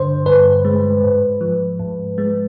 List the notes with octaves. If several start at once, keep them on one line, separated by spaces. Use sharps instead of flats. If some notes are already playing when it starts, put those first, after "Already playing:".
Already playing: G2 D3 C5
G2 B4
G#3
G#2
F3
G#2
G#3